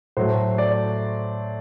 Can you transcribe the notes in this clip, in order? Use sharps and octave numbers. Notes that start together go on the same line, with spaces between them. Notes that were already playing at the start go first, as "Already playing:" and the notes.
A2 F#3 A3 C5
D5